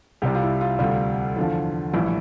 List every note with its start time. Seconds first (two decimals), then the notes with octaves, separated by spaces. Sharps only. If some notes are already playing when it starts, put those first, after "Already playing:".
0.22 C2 C3 G3 G4
0.34 F4
0.42 E4
0.61 F4
0.79 D2 C3 G3 F4
1.36 E2 D3 F3
1.93 A#1 A2 E3 G3 E4